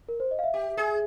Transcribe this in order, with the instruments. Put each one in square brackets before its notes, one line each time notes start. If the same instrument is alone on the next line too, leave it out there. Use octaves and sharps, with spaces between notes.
[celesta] A#4
C5
D#5
F5
E5
[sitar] G4
G#4